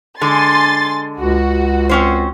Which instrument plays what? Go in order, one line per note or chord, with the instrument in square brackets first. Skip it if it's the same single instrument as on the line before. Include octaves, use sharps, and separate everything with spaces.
[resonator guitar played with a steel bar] D3 G#3 [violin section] G#5 C6 A6
[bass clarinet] C#2 [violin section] F#4
[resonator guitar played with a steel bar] C4 C#4 C5